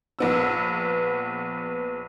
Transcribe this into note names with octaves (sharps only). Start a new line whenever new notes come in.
A#1 B3 E6